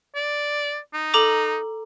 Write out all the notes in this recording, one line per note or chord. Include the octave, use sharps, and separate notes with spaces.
D5
D#4
A4 A#5 D6